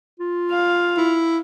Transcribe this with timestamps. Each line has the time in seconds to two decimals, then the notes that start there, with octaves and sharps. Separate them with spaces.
0.20 F4
0.52 F5
0.97 E4